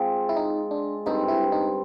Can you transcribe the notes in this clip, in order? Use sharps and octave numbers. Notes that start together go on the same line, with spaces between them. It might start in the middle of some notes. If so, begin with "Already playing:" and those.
Already playing: G#3 C4 F4
E4
D#4
D4
G2 D3 G3 C4 D#4
E4
D#4